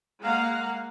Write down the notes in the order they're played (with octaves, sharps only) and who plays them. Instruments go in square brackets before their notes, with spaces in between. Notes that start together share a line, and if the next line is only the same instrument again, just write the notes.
[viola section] G#3 A#3 F5 F#5 A#5